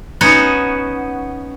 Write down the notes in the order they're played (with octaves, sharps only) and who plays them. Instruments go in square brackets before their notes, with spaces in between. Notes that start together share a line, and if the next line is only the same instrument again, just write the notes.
[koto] B3 C#4 D#4 F#4